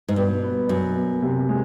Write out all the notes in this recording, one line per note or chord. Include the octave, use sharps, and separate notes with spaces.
G#2
G2 B2
B3
F#2 B2
B3
C3
G#3